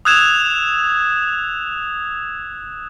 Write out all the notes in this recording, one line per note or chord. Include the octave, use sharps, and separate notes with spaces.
D#6 E6 F#6 G#6 E7 F7